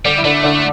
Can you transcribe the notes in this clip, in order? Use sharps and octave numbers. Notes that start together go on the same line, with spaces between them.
D3 G3 D4
E4
D3 A3 D4
D3 D4